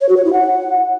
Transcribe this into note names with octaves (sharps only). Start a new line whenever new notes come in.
C#5
F#4
C#5
E4
F#5